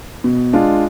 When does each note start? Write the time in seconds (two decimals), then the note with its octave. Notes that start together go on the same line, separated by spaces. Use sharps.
0.24 B2
0.53 G#3 D4 F4